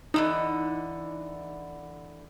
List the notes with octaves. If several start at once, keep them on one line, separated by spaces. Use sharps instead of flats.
D3 E3 G3 D#4